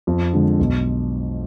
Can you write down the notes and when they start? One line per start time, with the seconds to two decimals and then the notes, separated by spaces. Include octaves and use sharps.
0.07 F2
0.33 D3 G#3
0.59 B1